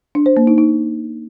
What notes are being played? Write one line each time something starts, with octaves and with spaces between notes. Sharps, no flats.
D4
C5
A#3
D#4
D#4